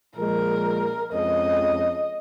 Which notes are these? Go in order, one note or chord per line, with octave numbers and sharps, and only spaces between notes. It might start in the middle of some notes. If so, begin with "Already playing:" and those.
A#2 F3 G#3 A#4
F2 F3 G#3 C#4 D#5